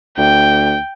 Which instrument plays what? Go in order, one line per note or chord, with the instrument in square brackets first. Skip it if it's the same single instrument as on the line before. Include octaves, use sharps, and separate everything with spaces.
[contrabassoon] D2 [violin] G5